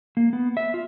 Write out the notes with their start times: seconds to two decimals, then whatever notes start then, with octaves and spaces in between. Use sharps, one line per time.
0.17 A#3
0.33 B3
0.57 E5
0.74 F4